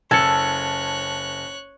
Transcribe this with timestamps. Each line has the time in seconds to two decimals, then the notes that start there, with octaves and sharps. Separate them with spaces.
0.11 F#1 A4 C#5 A5 F#6 G#6 A6 C#7